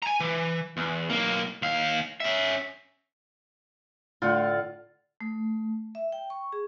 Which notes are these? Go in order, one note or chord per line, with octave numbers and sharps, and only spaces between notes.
G#5 A#5
E3
E2
B1 A#3
D#2 F5
C#4 E5
A2 D3 F4 F#5
A3
E5
G5
C#6
G#4